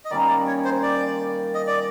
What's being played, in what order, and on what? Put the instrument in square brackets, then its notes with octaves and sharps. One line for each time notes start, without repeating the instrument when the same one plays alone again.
[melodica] D#5
[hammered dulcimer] D#3 G3 A#3 C#4 [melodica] D5
[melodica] D5
C#5
C5
D5
D#5
D5